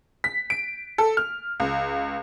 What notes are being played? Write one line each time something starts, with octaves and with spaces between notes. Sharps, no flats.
B6
D7
A4
F6
C#2